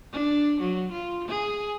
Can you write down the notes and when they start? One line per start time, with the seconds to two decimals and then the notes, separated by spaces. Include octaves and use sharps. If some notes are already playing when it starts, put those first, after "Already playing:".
0.13 D4
0.61 F#3
0.92 F4
1.29 G#4